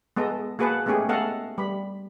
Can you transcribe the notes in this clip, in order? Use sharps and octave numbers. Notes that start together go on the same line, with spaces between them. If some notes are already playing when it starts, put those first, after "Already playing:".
G#3 B3 A4 D#5
A#3 F#4 G#4 B4 F#5 A5
G#3 A3 B3 C#4 G4 G#4
A3 B3 A4 D#5 F5 F#5
G3 B5